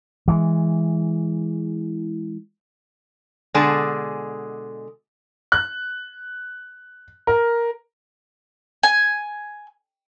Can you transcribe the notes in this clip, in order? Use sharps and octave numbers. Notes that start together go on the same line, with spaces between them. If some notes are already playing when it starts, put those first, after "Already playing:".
E3 G#3
B2 D3 G#3 G#4 D5 A5
F#6
A#4
G#5